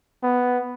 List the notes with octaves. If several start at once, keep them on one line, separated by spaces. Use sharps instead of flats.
B3